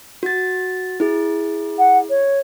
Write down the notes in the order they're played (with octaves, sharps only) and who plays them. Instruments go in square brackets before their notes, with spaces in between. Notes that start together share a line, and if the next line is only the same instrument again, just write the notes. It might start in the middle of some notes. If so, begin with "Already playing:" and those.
[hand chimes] F#4 A6
E4 G#4
[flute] F#5
C#5